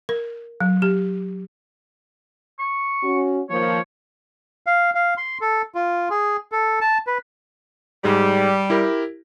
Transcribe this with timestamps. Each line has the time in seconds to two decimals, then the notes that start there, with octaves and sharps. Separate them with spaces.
0.09 A#4
0.60 F#3
0.82 G4
2.59 C#6
3.03 C#4 F#4
3.50 D#3 F3 A#3 C#5
4.66 F5
4.95 F5
5.17 C6
5.41 A4
5.75 F4
6.10 G#4
6.52 A4
6.81 A5
7.07 B4
8.04 G#2 G3 G#4
8.70 E4 G4 A#4